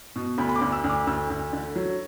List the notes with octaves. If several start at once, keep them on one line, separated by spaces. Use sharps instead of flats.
B2
D2 B5
B5
D6
D2
E6
D2
D6
D2 E6
D2
D3
F#3